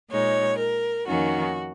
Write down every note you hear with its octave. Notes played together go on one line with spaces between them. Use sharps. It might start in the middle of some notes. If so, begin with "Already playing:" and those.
A#2 G#3 D#4 C#5
A#4
F2 D#3 A#3 C#4 F#4